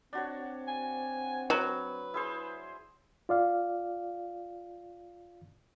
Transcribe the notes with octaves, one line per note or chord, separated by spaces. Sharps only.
C4 D4 F#4 C#5
G#5
F#3 B4
E4 G#4 C5
F4 D5 F5